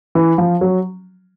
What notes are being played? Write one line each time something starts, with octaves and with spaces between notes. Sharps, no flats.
E3
F3
F#3